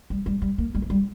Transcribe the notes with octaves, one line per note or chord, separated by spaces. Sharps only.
G3
G3
G3
A#3
G3
F3
G3